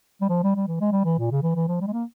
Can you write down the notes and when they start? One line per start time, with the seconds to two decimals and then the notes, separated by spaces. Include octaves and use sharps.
0.21 G3
0.30 F3
0.43 G3
0.56 G3
0.68 E3
0.81 G#3
0.92 G3
1.05 E3
1.18 A#2
1.31 C#3
1.43 E3
1.55 E3
1.68 F3
1.81 G3
1.87 G#3
1.93 A#3